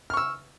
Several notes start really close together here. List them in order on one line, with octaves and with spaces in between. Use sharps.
F6 C#6 E6